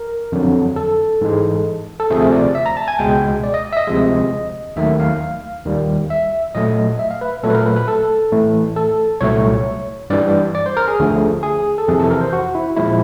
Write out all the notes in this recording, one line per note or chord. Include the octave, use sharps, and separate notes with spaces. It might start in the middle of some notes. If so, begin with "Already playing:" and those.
Already playing: A#4
F2 D3 F#3
A4
G#2 E3 G#3
A4
D2 C3 F3 A3 G#4
D5
E5
A#5
A5
G#5
C#2 B2 G#3 G5
D5
D#5
E5
D#5
D2 C3 F3 G#3
D#2 D#3 F#3 A3 E5
F5
D#2 D#3 G3
E5
A#2 F#3 A3 D#5
E5
F5
B4
A#2 F#3 A3 A4
B4
A#4
B4
B4
A4
A2 E3 A3
A4
C2 A#2 F#3 A3 C#5
G2 E3 G3 D5
D5
C5
A#4
G#4
D2 D3 F3 A3
G#4
A4
F2 C3 E3 G#4
A4
A#4
C5
F#4
E4
A#2 F3 G#3 E4